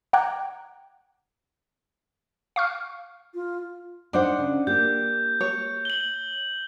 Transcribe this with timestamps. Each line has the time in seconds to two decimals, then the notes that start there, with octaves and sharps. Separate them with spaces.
0.13 F#5 G5 A#5 D6 F#6 G#6
2.56 F5 C#6 F6
3.34 F4
4.13 D4 D#4 C5 F#5
4.38 C#3
4.67 A#3 G4 G6
5.41 C#5
5.85 F#7 G7